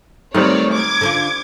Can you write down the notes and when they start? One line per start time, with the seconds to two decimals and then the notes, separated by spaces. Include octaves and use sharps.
0.35 D#3 F#3 G3 A3 C4 C#5 D5
0.72 D6 G#6
1.01 D3 D4 F4